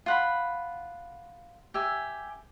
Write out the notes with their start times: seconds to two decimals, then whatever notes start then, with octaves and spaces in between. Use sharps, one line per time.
0.06 F4 F#5 B5
1.74 G4 E5 G#5